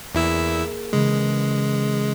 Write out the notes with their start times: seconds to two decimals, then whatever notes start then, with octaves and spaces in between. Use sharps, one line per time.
0.15 E2 A#3 E4 G#4 D5 E6
0.93 C#3 E3 G#3